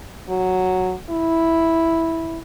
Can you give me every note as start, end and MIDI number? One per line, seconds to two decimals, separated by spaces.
0.29 0.94 54
1.10 2.40 64